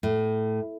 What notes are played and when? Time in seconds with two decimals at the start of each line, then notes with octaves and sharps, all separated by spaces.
0.03 A2